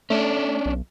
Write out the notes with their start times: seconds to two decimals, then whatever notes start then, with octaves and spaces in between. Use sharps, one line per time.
0.10 A3 C#4 D4
0.65 B1